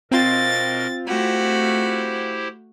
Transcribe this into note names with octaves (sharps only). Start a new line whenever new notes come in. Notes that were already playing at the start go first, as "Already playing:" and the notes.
B2 C4 F4 A#4 D#5 A6
A3 E4 F#4 G4 C5